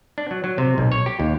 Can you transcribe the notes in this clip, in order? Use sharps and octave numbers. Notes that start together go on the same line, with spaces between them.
D4
F#3
F#3
C3
B1
C#5
G4
D#2